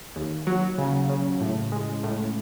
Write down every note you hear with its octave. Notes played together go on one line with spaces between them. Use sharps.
D#2
F#3
C#3
C#3
A2
G#3
A2